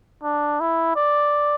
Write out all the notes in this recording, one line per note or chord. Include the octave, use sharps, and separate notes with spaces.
D4
E4
D5